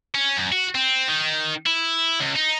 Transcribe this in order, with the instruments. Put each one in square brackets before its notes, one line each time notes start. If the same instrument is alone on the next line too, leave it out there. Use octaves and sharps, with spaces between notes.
[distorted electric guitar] C#4
F#2
F#4
C4
D#3
E4
C#2
D#4